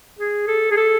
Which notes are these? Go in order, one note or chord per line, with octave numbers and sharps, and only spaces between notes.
G#4
A4
G#4
A4